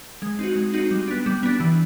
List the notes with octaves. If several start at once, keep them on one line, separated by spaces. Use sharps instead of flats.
G#3
C4 D#4 F#4
G#3
C4 D#4 F#4
G3
B3 D4
G3
B3 D4
E3